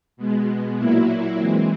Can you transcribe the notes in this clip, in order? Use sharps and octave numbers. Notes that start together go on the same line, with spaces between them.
B2 G#3 B3
A#2 F#3 A#3 E4
E3 G#3 C4